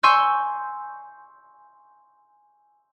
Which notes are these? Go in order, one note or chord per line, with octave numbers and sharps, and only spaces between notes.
G#5 C6 C#6 E6 G6